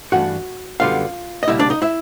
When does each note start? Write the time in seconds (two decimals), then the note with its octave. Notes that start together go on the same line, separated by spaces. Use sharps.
0.12 G2 E3 A3 D4 F#4 F#5
0.80 F#2 D3 G3 B3 F4 F5
1.43 D#5
1.48 C#2 B2 G3 A#3 E4 E5
1.59 D4 D5
1.70 D#4 D#5
1.82 E4 E5